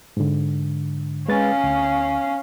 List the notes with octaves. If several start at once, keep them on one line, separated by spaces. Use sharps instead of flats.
G#2 D3
G#3 C#4 B4 F5 A6
D2